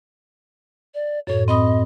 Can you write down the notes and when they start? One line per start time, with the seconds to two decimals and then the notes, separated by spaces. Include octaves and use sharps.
0.94 D5
1.27 F#2 A2 C#5
1.48 C4 D#5 B5 D#6